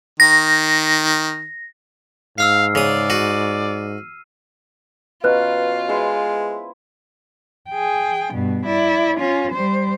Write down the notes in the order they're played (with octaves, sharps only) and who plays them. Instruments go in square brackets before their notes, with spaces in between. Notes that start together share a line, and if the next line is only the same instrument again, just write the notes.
[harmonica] D#3 [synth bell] A#6
[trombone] G#2 [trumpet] F5 [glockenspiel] E6 F6 C7
[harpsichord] C#3 D#6 [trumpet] D5
[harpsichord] F#4 [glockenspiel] D#7
[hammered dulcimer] B2 C#4 A#5 [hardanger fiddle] F4 [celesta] B4 F#6
[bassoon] G#3 [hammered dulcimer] E4 C5 G#5
[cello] G#4 G5
G2 B2
E4 D5
C#4 F4
G3 C5